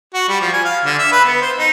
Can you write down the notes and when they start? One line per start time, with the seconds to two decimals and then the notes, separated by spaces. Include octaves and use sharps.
0.14 F#4
0.28 G3
0.41 F3
0.53 G#5
0.65 F5
0.84 D3
0.99 E5
1.12 B4
1.25 B3
1.41 C5
1.58 D#4